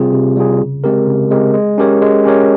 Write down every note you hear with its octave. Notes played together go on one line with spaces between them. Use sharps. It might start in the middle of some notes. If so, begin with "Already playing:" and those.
Already playing: C3 G3 C4 F4 G#4
C3
G3 C4 F4 G#4
C#3
G#3 C4 G4 A#4
C#3
G#3 C4 G4 A#4
G#3
C#4 G4 A#4 C#5
G#3
C#4 G4 A#4 C#5